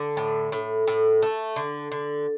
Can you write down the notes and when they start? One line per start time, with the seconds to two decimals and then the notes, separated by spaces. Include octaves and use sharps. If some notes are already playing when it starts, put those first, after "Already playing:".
Already playing: D3
0.17 A2
0.52 A2
0.88 A2
1.22 A3
1.56 D3
1.92 D3